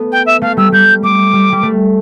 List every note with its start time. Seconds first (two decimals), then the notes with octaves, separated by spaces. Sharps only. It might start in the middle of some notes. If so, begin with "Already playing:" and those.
Already playing: A3 B3
0.11 G5
0.26 E5
0.41 A3 F5
0.57 G3 E6
0.72 G3 G6
1.02 A3 D6
1.33 G3
1.52 G3
1.63 A3